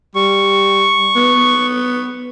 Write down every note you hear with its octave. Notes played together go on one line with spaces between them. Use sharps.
G3 C#6
B3